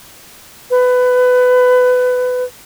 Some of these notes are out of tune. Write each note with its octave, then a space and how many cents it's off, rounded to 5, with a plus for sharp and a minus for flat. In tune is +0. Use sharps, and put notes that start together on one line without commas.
B4 +20